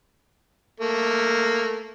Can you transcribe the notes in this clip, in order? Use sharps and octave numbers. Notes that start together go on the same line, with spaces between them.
A3 A#3